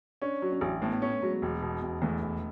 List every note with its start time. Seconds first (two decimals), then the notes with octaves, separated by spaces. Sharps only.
0.22 C#4 D4
0.42 F#3
0.52 C#4
0.61 A1
0.82 A2 B3
0.92 B3
1.01 A3 C#4
1.22 F#3 G#3
1.42 E1
1.62 B2
1.82 E1
2.02 E2 A3
2.22 E1